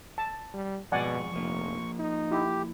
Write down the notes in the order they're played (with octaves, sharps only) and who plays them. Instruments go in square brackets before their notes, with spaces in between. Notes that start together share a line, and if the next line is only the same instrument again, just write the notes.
[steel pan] A5
[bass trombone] G3
[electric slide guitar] F2 G#2 G#4 [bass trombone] B2 [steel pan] D5 F#5 G#5 [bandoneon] C#6
[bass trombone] F1 [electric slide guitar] F3 A#3
[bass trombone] D#4
[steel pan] E4 [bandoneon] G4